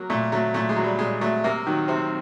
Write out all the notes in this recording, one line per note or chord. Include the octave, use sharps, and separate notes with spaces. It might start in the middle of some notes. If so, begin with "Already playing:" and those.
Already playing: F#3 A#3
A#2 A3
F#3 A3
A#2 A3
G#3
F#3
G3
A#2 G#3
F#3 A3
C3 A#3
D#3 F#3
C3 C4